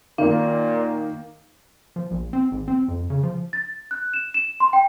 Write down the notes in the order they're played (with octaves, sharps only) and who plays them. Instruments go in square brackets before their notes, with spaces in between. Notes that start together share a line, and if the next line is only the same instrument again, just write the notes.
[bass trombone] A#2 [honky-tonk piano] D#3 A#3 [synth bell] F5
[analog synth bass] F3
A#1
C4
G#1
C4
F2
C#3
F3
[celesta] A6
F#6
E7
E7
C6
G5